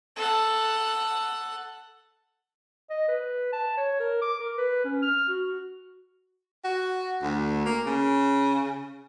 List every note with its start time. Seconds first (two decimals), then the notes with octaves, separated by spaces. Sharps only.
0.16 A4 F#5
2.90 D#5
3.08 B4
3.53 A5
3.77 C#5
4.00 A#4
4.22 D6
4.40 A#4
4.58 B4
4.84 C#4
5.02 F6
5.28 F#4
6.64 F#4
7.22 D2
7.66 A#3
7.86 C#3